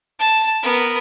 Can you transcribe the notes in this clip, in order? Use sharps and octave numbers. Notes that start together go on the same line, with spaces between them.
A5
B3 A#4